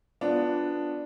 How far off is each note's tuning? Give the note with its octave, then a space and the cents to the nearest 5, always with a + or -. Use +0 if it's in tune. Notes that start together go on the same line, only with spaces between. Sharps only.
B3 +0 D4 +0 F4 +5